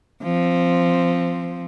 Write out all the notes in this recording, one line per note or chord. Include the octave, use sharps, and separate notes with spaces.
F3 C4